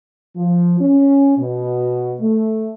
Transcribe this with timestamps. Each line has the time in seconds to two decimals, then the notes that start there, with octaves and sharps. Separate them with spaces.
0.36 F3
0.80 C#4
1.38 B2
2.20 A3